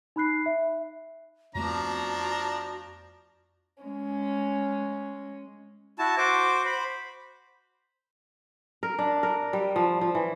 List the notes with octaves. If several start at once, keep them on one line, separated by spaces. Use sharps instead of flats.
D#4 B5 F#6 C7
E5
F2 F3 A3 B3 D4 F#4 A#5
G#3 C#4
E4 F#4 A5
F#4 C5 D6
C5 B5
A#4
D4
A#4
G3
F3
F3
E3